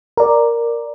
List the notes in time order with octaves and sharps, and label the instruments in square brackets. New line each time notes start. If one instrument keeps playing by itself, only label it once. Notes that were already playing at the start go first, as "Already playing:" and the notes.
[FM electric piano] A#4 D5